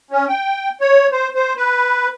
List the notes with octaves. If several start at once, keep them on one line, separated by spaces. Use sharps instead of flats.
C#4
G5
C#5
C5
C5
B4